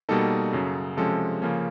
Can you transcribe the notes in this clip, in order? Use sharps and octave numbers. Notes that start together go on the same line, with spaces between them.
B2 G3 A#3 D#4 A4
F#2 C#3 F#3
C3 F3 G#3 C#4 A4
C#3 F3 A#3 C#4